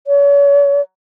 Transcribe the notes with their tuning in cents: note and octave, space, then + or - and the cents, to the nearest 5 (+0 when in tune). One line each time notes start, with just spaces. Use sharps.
C#5 +40